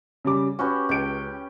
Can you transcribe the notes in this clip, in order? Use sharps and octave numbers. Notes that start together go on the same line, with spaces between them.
C#3 G3 D6
C#4 F#4 G4 B4
C#2 G5 D7